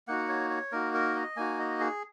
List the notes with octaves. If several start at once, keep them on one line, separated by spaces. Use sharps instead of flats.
A#3 D#4 F#4 F#5
C#5
C#5
A#3 D#4 F#4 A#4
A#4
D#5
A#3 D#4 F#4 G#5
D#5
G#4